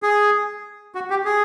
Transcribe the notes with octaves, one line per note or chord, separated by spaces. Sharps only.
G#4
F#4
G4
G#4